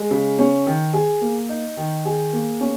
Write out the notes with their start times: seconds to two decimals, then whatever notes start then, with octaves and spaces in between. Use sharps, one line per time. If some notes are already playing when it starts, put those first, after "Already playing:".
Already playing: G#3
0.11 C#3
0.39 C#4
0.66 D#3
0.93 G#4
1.21 A#3
1.49 D#4
1.77 D#3
2.05 G#4
2.33 A#3
2.61 C#4